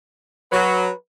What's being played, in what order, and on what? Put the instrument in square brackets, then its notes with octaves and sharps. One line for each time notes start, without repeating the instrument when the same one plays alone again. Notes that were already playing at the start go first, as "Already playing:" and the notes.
[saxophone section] F#3 [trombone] B4